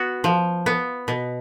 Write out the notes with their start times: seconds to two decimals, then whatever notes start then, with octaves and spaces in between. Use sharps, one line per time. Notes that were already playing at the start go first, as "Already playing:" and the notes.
Already playing: B3 F#4
0.24 F3
0.66 B3
1.08 B2